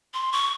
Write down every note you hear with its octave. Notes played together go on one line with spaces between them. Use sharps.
C6
C#6